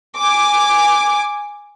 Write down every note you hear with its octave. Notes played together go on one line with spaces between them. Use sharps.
G#5 D6